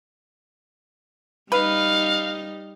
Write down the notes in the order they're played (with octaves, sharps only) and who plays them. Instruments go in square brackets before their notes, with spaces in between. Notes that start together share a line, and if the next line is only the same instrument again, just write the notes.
[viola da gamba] G3 D#4 [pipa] B4 [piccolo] F5